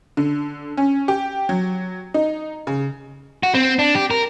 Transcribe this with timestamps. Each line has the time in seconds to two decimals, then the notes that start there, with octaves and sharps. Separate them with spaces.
0.17 D3
0.77 C#4
1.08 G4
1.49 F#3
2.14 D#4
2.67 C#3
3.43 F#4
3.54 C4
3.79 D4
3.95 G4
4.11 A#4